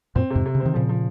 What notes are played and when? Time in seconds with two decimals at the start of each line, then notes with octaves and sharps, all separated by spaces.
0.16 F#2 A#2 C4
0.30 C3
0.35 F2 G#2
0.46 C3
0.55 C#3
0.60 C4
0.66 D#3
0.74 A#2 C#3 F3
0.89 F3